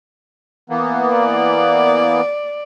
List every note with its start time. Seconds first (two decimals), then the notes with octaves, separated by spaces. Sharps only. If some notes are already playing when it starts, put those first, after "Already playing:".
0.70 E3 A#3 B3
1.16 D5